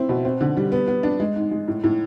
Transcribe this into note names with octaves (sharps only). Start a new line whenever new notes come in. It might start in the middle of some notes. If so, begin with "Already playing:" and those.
Already playing: C4 E4
B2
C4
D3
G3
B3
B3
D4
G#3
G#2
G#3
A2
A2